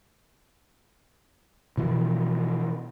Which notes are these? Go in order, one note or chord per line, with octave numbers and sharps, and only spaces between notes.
B2 E3 F3